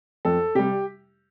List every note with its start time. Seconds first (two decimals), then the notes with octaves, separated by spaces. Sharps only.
0.25 F2 A4
0.55 C3 G3 G4